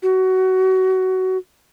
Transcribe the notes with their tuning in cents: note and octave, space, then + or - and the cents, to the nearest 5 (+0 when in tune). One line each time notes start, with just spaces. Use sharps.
F#4 +20